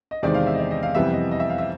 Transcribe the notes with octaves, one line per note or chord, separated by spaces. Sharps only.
D#5
E2 C3 D#3 G#3 C4 D5
F5
E5
D#5
D5
D#5
F5
F2 C3 E3 G3 B3 E5
D#5
D#5
E5
F5
E5